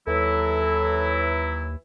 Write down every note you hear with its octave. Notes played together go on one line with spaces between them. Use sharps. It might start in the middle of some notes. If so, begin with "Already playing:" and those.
D#2 E3 F#3 E4 A4